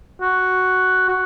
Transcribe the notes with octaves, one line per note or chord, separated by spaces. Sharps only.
F#4
F#4